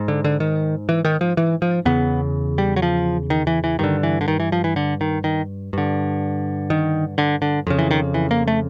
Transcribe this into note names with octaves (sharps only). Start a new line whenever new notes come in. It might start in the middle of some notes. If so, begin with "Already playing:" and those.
Already playing: G#2
D3
D3
D#3
E3
D#3
F3
E3
F3
E2 C#3 B3
G3
F#3
F3
D#3
E3
E3
G2 D3 D#3
E3
D3
D#3
E3
F3
E3
D3
D#3
D#3
G2 D3
D#3
D3
D3
F2 C#3
E3
D#3
E3
A#3
A3